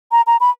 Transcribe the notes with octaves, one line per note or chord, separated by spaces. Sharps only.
A#5
A#5
B5